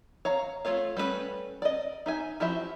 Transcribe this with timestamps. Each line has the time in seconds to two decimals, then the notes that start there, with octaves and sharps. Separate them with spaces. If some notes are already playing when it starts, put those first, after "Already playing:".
0.25 C#5 F5 A#5
0.65 A3 F4 C#5 F5
0.97 G3 A3 C#4 D4 B4
1.62 D5 D#5
2.06 D#4 E5 G#5
2.40 F3 E4 F#4 G4 E5